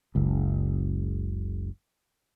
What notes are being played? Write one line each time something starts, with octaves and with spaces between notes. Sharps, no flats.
F#1 C#2